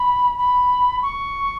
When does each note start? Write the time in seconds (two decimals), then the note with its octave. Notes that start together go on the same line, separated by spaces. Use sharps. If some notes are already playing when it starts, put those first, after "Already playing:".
Already playing: B5
0.38 B5
1.02 C#6